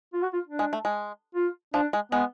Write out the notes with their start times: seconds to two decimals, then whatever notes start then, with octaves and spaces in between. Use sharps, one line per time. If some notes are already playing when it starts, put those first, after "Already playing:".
0.13 F4
0.22 F#4
0.33 F4
0.47 D4
0.59 G#3
0.73 A3
0.85 G#3
1.35 F4
1.74 F3 D4
1.93 G#3
2.12 G#3 B3